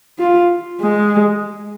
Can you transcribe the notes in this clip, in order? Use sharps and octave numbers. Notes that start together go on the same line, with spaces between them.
F4
G#3